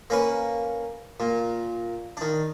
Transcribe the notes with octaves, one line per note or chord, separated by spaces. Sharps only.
A#3 C#4 B4
A#2
D#3 D4